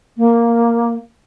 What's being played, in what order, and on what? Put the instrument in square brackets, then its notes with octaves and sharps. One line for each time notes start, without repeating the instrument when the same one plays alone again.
[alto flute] A#3